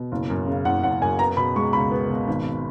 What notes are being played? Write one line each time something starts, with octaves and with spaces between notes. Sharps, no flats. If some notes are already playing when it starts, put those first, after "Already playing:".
Already playing: B2
F#1
F#2
C#3
F#1 F#5
F#1 F#5
F#2 G#5
B3 A#5
B2 B5
G#3 C#6
C#2 B5
B3
B2
G#1